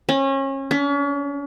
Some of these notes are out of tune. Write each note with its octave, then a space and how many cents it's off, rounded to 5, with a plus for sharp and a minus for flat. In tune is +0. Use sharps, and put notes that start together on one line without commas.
C#4 -30
C#4 +40